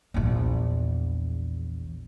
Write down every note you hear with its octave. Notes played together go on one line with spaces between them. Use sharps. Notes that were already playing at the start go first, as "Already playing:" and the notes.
A#1 E2